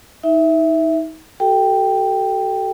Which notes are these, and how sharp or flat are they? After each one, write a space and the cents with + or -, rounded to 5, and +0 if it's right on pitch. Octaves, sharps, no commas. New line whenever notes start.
D#4 +30 E5 +0
F#4 +40 A4 +0 G5 +0